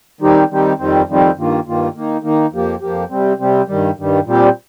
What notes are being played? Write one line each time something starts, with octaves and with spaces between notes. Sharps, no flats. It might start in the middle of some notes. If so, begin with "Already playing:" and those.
D#3 G3 C4 D#4 G4
D#3 G3 C4 D#4 G4
F2 D#3 G3 C4
F2 D#3 G3 C4
G2 D#3 A#3 F4
G2 D#3 A#3 F4
D#3 A#3 D#4
D#3 A#3 D#4
F2 F3 A#3 G4
F2 F3 A#3 G4
C3 G3 C4
C3 G3 C4
G2 D#3 G3
G2 D#3 G3
A#2 G3 C4 G4